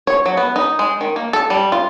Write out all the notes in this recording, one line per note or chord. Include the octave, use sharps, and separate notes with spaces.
C#5
F#3
B3
D#4
G#3
D#3
A#3
A4
G3
F4